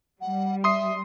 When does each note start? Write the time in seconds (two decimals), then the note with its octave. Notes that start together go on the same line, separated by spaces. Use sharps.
0.21 G3 F#5
0.64 E5 C6 D#6 C7